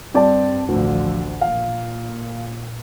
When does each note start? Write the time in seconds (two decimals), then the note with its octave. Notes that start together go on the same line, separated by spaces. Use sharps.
0.14 G2 C4 D5 A5
0.68 A1 D2 D3 F3
1.41 A#2 F5